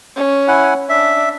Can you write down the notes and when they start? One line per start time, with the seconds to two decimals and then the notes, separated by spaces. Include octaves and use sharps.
0.16 C#4
0.48 E4 F#5 G#5
0.89 D4 E5